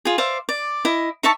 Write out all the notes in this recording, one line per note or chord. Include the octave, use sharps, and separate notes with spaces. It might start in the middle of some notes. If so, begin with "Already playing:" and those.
F4 G#4
C5 D5 E5 F5
D5
E4 D#5
D#4 E5 A5 C#6